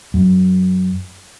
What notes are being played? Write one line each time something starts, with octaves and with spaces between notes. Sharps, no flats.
F#2